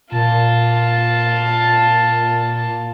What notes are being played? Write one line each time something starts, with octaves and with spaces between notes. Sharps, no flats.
A#2 F4 A5